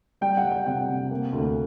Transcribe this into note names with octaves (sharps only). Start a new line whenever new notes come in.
G3 G5
F#5
G3
G5
C3 F#5
C3
A#3
D2